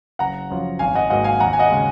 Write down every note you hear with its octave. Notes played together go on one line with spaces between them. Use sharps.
F#1 F#5 A#5
F#2 F3
G#1 F5 G#5
D#5 F#5
G#2 F#3 A#3 D#5 F#5
F5 G#5
D#2 F#5 A#5
G#5
D#5 F#5
C#3 G#3